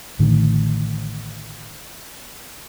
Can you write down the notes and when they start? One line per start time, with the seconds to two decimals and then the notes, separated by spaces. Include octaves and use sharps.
0.19 A1 A2 D3 D#3